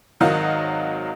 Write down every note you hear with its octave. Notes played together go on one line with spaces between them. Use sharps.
G#1 D#3 F#3 D#5 F5 F#5